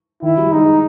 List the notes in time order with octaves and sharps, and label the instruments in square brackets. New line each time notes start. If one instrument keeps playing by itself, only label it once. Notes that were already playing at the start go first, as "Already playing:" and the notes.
[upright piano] D#3 [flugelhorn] E4
[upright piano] G3
[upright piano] G#3 [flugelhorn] D#4